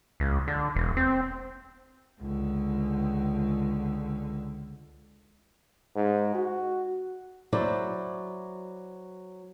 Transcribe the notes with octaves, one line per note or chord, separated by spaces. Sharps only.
C#2
D3
E1
C4
C#2 D3
G#2
F#4
F#3 E4 C5 D5